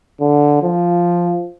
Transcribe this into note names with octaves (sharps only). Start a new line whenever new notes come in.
D3
F3